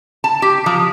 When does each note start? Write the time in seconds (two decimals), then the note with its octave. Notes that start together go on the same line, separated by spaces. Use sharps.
0.24 A5
0.42 G4
0.66 F3